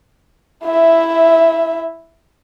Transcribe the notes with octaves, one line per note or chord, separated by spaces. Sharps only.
E4 E5